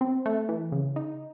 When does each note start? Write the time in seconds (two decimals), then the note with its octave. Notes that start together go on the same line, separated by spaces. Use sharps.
0.01 C4
0.26 A3
0.49 E3
0.72 C#3
0.96 D#4